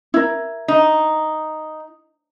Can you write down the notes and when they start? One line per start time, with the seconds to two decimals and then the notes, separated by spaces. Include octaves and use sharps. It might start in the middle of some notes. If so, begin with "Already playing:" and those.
0.14 E4 A#4
0.68 D#4